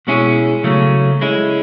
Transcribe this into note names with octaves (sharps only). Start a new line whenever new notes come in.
B2 G#3 C#4 E4 G#4
C#3 F#3 A3 C#4
G#3 C#4 E4